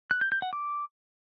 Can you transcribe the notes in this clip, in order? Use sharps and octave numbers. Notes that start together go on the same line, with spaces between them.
F#6
G6
G6
F#5
D6